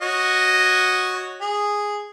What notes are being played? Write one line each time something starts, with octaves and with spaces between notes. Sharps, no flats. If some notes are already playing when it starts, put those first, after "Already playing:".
F#4 C#5 D#5
G#4